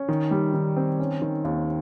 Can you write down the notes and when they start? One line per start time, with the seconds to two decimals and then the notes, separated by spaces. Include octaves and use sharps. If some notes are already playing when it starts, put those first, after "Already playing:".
Already playing: C#4
0.09 D#3
0.31 G3
0.54 D#3
0.77 C4
0.99 C#4
1.22 D#3
1.44 D#2